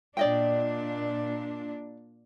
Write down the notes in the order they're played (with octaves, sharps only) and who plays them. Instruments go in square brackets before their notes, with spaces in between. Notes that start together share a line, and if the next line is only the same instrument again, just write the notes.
[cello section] A#2 D4 [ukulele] D5 D#5 G5